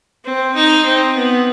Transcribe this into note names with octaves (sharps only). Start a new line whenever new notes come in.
C4
D#4
C4
B3